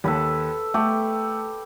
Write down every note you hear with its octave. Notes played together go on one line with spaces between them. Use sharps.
D#2 A4 B4 B5
A3 G4 A4